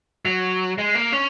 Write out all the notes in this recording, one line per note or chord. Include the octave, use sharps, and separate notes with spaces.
F#3
G#3
A#3
C#4